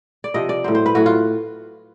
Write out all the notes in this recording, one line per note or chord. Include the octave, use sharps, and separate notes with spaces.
D5
C3 F3 D#5
D5
A2 F#3 C5
C5
B4
A2 F#3 F#4
F4